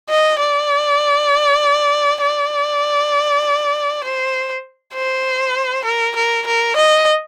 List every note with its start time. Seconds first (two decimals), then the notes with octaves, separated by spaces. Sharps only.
0.09 D#5
0.39 D5
2.21 D5
4.04 C5
4.94 C5
5.85 A#4
6.16 A#4
6.46 A#4
6.76 D#5